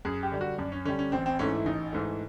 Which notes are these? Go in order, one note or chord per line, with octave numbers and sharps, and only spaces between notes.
F#2 G#4
G4
D3 G3
F#4
F#2 D4
C#4
D3 G3 C#4
C#4
A1 C4
C4
G#2 E3 A3 C#4
E4
A1 D#4
G#2 E3 A3